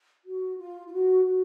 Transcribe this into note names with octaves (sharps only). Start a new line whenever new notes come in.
F#4
F4
F4
F#4
F#4